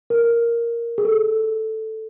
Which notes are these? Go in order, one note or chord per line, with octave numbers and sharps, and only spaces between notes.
A#4
G#4
A4